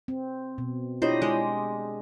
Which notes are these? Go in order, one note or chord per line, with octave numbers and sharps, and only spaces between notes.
C4
B2
D4 E4 F4 G4 C5 C#5 D#5
G#3 G#4